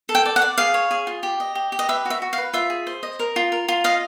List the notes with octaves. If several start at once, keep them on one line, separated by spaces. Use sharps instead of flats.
A4
G5
D5
F#5
D5
G#4 F5
C#5
G#4
F4
G4
D#5
G4
G4
D#5
B4 E5
F#4 E5
F#4
F5
B4
F4 E5
G#4
C5
D#5
A#4
F4
A#4
F4
D#5 F5